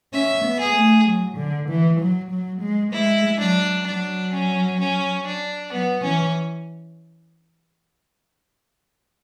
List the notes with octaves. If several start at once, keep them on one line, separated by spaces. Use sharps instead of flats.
C#4 E5
B3
G#4
A3
F#3
D3
E3
F#3
F#3
G#3
G#3 E4
F#3 D4
F#3 D4
C#4
C#4
D4
F#3 B3
E3 C#4